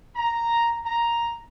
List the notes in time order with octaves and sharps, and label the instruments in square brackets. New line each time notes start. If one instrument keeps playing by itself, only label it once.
[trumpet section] A#5
A#5